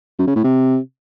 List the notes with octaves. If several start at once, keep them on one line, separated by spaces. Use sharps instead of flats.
F#2
C#3
A2
C3